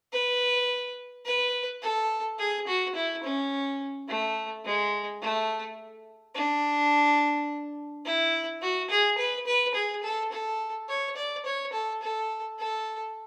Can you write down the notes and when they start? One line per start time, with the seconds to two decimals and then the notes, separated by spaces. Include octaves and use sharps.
0.12 B4
1.25 B4
1.82 A4
2.39 G#4
2.67 F#4
2.96 E4
3.23 C#4
4.08 A3
4.65 G#3
5.22 A3
6.35 D4
8.05 E4
8.62 F#4
8.90 G#4
9.18 B4
9.46 B4
9.74 G#4
10.03 A4
10.32 A4
10.89 C#5
11.17 D5
11.45 C#5
11.73 A4
12.02 A4
12.59 A4